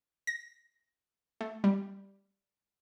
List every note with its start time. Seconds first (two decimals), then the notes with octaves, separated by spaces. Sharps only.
0.27 A#6
1.41 A3
1.64 G3